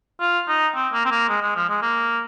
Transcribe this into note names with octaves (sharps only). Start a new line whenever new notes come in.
F4
D#4
C4
A#3
C4
A#3
G#3
G#3
F3
G#3
A#3